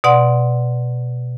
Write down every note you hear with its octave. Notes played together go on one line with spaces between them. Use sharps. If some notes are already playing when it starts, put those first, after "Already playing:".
B2 D5 F#5 C6